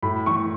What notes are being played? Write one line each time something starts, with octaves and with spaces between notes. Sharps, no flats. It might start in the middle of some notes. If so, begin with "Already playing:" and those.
A2 B5
E3 C#6